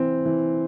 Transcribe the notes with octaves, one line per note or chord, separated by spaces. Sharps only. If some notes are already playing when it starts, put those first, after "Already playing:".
Already playing: E3 C4
E3